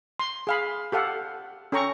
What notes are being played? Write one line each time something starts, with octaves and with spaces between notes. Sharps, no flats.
C6
G#4 F5 B5
G4 A4 F5 F#5
C#4 A4 G5 A#5 C#6